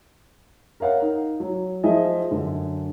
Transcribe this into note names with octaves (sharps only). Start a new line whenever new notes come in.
A#4 C#5 F5 F#5
D#4
F#3
F3 G#4 D#5 E5
F#2 D3